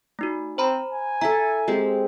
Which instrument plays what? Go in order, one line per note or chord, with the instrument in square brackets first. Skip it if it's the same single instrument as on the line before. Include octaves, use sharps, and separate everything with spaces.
[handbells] A3 D#4 F#4
[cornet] C4 [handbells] C5 A#5 B5
[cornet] G#5
[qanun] E4 A4 [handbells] A#5 B6
[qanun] G#3 C4 G4